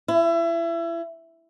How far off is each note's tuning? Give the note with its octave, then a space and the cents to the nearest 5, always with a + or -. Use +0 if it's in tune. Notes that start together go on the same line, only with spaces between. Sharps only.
E4 +30